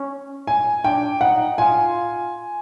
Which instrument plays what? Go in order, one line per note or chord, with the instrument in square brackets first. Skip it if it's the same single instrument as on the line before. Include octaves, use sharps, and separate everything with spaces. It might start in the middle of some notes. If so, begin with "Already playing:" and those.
Already playing: [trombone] C#4
[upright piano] G#5
[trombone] D4 [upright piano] G5
[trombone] D#4 [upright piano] F#5
[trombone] F4 [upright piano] G#5